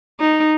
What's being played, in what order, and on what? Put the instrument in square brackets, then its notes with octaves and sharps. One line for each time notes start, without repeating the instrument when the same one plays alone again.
[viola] D#4